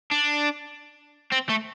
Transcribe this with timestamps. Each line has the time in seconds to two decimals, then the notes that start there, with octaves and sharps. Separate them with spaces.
0.11 D4
1.32 C4
1.50 A3